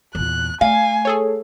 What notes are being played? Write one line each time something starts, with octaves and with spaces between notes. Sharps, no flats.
E2 A#2 F#6
A3 F5 G#5
G#4 A4 C#5